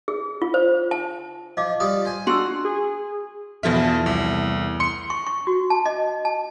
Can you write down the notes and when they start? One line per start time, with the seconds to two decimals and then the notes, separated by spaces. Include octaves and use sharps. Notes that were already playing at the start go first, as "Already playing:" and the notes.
0.08 G#4
0.42 F4
0.54 C5
0.91 A5
1.57 F3 D#5 F5 D6
1.80 G3 F4 D5 D#6
2.05 C5 G#5
2.27 D4 F4 F#4 C6 E6
2.65 G#4
3.63 E2 B2 F3 A3 E4 F6
4.06 C2
4.80 C6 C#7
5.10 C#6
5.27 C#6
5.47 F#4
5.70 A5
5.86 D#5
6.25 A5